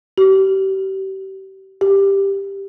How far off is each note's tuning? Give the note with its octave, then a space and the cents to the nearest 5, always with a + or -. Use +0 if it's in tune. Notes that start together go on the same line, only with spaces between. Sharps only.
G4 -35
G4 +10